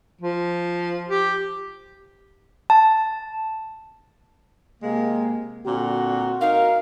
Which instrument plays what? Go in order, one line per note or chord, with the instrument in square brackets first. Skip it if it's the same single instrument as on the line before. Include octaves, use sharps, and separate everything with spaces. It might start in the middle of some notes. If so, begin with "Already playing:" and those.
[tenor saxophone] F3
G4
[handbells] A5
[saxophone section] C3 G#3 A#3
[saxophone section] A#2 D3 C4 [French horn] F#4
[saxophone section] D#4 A#4 [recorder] F5